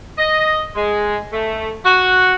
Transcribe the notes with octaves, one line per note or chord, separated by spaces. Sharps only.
D#5
G#3
A3
F#4